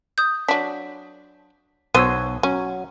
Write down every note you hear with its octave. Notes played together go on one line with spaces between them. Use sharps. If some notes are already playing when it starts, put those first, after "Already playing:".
D#6 G6
F#3 D4 B6
B1 B3 F#4 C5 C#5 E6 D#7
F#3 C#4